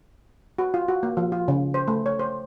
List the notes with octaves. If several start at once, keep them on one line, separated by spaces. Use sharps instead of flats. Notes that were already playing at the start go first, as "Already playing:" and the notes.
F#4
F4
F#4
A#3
F3
F4
C#3
C5
A3
C#5
C5